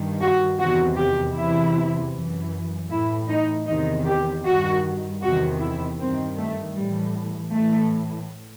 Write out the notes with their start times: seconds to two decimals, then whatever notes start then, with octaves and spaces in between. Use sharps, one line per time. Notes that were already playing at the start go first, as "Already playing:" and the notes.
Already playing: G2 D#3
0.20 F#4
0.58 E2 C3 D#3 F#4
0.97 G4
1.35 E2 C3 E3 E4
2.13 F#2 E3
2.90 A2 E3 E4
3.29 D#4
3.67 E2 C3 D#3 D#4
4.06 G4
4.45 G2 D#3 F#4
5.22 E2 C3 D#3 F#4
5.60 E4
5.99 G2 D#3 C4
6.38 A3
6.77 A2 E3 G3
7.53 A2 E3 A3